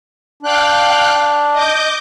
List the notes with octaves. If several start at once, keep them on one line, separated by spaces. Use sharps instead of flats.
D4 F5 G5 F#6
D#5 D6 G6